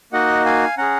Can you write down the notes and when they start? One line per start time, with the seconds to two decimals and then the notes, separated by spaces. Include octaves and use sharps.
0.13 A#3 D#4 F#4 D#5 F#5
0.46 F5 G#5
0.78 C#4 G#4 F#5 A#5